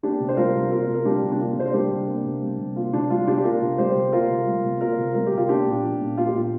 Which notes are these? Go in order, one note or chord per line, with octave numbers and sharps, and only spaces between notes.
A#3 D4 G4
C3
C5
G3 F4 A#4
C3
A#3 F4 A#4
C3
A#4
G3 D4 G4
C3
D4
A#3 F4
C3 C5
A#4
G3 D4 G4
C3
A#3
C3
G3
C3
A#3 F4
C3 D4
G3 F4
C3 D4 G4
G4
A#3 F4 A#4
C3
G3 G4 C5
C3
A#3 F4 A#4
C3
G3
C3
A#3 F4 A#4
C3
G3 A#4
G4
C3
F4 A#4
A#3 D4 G4
A#2
F3
A#2
A#3 F4
G4
A#2 F4